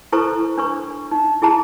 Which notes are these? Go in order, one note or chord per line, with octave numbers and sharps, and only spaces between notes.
E4 A4 B4 C5 A#5 C#6
D4 B4 C#6
D#4
E4 G#4 A5 A#5